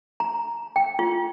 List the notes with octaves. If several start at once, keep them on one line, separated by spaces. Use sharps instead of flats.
A#5
G5
F4